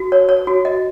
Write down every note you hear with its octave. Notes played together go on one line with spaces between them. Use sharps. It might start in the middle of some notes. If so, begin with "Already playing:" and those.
Already playing: F#4
C#5
C#5
F#4
D#5